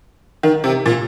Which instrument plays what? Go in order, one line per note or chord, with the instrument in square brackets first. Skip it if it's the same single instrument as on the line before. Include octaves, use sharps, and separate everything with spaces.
[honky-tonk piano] D#3
C3
A#2